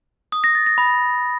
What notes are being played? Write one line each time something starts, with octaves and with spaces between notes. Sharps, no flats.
D#6
A#6
A6
A#6
B5